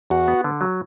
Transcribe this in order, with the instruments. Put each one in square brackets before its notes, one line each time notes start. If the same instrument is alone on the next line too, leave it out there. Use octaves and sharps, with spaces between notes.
[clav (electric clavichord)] E2 [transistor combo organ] F#4
[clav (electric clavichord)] B3
D3
F#3